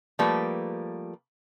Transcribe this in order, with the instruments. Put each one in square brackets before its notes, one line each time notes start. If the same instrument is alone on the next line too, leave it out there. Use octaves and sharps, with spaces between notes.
[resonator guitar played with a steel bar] F3 G3 A3 A#3 B4